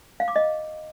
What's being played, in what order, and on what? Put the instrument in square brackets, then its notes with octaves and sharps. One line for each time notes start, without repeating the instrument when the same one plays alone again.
[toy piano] F5
D6
D#5